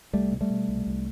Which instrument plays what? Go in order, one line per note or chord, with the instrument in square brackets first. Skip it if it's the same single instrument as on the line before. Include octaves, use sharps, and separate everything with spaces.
[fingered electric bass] C2 G3 A3
B2
G3 A3
B2
C2
C2